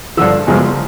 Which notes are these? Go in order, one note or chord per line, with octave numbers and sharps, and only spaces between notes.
G2 D3 F3 E6
G1 F#2 C#3 F3 G#3